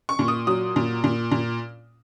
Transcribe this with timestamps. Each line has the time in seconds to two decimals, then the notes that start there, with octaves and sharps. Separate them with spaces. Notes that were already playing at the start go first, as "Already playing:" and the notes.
0.09 C#6
0.19 A#2
0.28 D#6
0.47 F#3 D#6
0.76 A#2
1.04 A#2
1.31 A#2